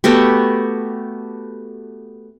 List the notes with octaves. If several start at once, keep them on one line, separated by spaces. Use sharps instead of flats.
A3 B3 F#4 G4